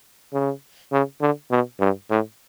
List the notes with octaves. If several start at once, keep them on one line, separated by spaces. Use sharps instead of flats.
C#3
C#3
D3
B2
G2
A2